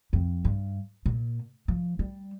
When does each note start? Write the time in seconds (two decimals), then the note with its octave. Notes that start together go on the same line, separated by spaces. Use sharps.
0.13 F2
0.45 G2
1.06 A#2
1.68 F3
1.99 G3